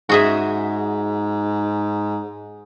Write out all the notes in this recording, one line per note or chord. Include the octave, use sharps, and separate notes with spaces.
G#2 F#4 G#4 E5